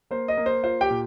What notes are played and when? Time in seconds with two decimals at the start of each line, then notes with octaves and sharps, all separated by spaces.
0.11 A#3 C5
0.28 D#5
0.37 A#3
0.46 C5
0.63 F4 C5
0.81 G4 G5
0.90 A#2